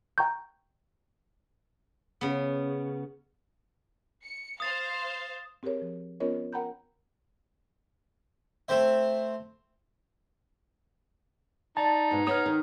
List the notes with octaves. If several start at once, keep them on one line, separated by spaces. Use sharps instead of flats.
G5 A#5 C#6 G6
C#3 B3
C#7
C5 F5 D#6 A6
C4 G4 G#4 A#4 C#5
F3
B3 C#4 F4 A#4 C#5 D#5
A#4 F#5 G5 A#5 B5 G6
A3 C4 C5 E5
D#4 D5 A5
G#2 B2
B3 C#5 D#6 F6
D#3